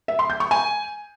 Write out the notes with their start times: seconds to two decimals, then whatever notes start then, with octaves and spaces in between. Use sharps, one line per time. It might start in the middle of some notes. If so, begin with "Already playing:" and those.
0.08 E5
0.19 C6
0.30 G6
0.40 C#6
0.51 G#5